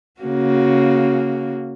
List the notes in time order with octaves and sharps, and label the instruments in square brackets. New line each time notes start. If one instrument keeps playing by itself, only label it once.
[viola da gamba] C#3 A#3 F#4